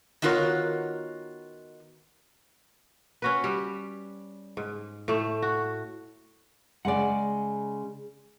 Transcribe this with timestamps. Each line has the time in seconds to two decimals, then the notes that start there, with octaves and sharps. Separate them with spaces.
0.22 D#3 B3 F4 F#4 A#4 C#5
3.22 C#4 F#4 B4
3.44 G3
4.57 G#2
5.08 A2 A3
5.42 F#4
6.85 C#3 G#3 D5 F#5